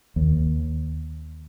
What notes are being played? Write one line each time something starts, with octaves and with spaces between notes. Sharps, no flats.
D#2